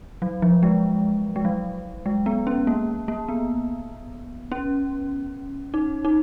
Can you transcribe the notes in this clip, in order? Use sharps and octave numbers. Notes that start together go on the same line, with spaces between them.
F#3
F3
G#3
G#3
F#3
G#3
B3
C#4
A#3
A#3
B3
C#4
D#4
D#4